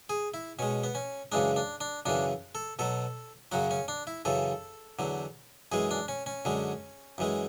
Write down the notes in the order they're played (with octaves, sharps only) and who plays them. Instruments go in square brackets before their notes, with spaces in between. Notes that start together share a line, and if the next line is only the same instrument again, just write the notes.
[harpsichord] G#4
E4
B2 G#3 C#4
B3
C#4
F#2 C#3 E3 G#3 D4
D4
D4
F#2 C#3 E3 D4
A4
B2 F#3 A4
F#2 C#3 F#3 F#4
C#4
D4
E4
F#2 C#3 E3 A4
E2 D3 F#3
F#2 E3 G#3 G#4
D4
C#4
C#4
F#2 D3 G#3
F#2 E3 G#3